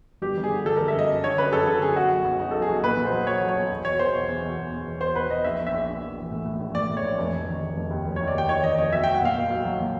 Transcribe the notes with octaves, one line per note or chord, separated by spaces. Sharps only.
G1 G4
G1
G#4
D3
G1 A4
G1 A#4
E5
F#2 D#5
F#2
D3 C#5
F#2 B4
F#2 A4
D3 A4
F#2 G#4
B1 F#4
B1
B1
B1 D#4
B1 A4
G#4
B1
A#2 B4
A#2
C5
F#3
F#3 C#5
F#3
C#5
B1
E2
B2 C#5
E2 C5
B2
E2
B2
E2
E2
E2
B2 C5
B2 B4
B2 D#5
A#1 E5
A#1
E5
A#1
A#1
A#1
E3
A2
A2
A#1
A2 D5
A2
C#5
A#1
F1
F1
D#3
F1
F1
D#2
F1
D#3 C#5
D5
D#2 G5
D#3 C#5
D#3 D#5
F1 D#5
B1 E5
B1 G5
F#5
A#2 F5
A#2
B1
F#3
A#2